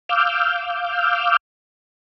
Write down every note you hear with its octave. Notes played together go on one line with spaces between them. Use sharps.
F5 D6 E6 F6 G6